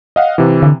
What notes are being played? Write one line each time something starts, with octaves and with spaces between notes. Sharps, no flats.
D#5 F5 F#5
C3 E3
D3